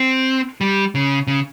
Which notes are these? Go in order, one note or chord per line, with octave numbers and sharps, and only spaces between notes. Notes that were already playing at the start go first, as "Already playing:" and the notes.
Already playing: C4
G3
C#3
C#3